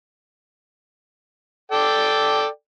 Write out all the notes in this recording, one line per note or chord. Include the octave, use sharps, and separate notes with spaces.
A4 D5 G5